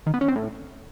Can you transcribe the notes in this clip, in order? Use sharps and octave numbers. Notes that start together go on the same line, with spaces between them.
D#3
B3
C#4
C4
A2